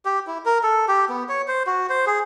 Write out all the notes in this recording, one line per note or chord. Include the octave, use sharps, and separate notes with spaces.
G4
E4
A#4
A4
G4
B3
C#5
C5
F#4
C5
G#4